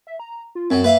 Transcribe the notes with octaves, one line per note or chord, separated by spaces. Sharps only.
E5
A#5
F4
F#2 F#3 C4
A#3 B4 E5 F5